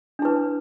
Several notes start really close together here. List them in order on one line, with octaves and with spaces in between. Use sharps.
D4 E4 B4